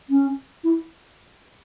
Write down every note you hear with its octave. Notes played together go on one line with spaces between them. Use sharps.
C#4
E4